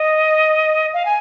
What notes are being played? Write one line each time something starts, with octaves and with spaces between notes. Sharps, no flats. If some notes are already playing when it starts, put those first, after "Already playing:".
Already playing: D#5
F5
G#5